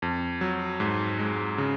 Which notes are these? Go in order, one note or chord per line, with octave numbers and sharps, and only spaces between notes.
F2
F#3
G#2
G#3
C#3